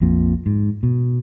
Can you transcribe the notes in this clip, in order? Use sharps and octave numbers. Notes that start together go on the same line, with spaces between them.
A#1 F2 A#2
G#2
B2